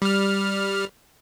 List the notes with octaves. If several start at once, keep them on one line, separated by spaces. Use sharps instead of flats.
G3 F6